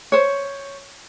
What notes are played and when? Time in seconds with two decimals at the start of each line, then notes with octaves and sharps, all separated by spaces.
0.12 C5 C#5